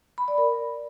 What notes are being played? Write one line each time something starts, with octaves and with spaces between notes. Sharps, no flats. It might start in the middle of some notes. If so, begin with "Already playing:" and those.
B5
D5
A#4